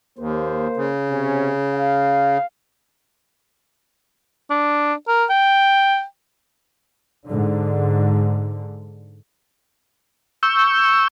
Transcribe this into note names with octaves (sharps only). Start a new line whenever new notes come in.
D#2 A#3 C5
C#3
C3 C#4
F5
D4
A#4
G5
G#2 D3
C#6 E6 G6